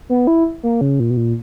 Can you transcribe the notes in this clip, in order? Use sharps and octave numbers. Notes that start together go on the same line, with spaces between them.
B3
E4
A#3
C#3
A#2
B2
A#2